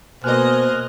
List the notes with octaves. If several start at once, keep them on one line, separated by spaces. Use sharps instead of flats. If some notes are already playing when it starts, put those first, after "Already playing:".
B2 A#3 C5 D#5 G#5 F6 F#6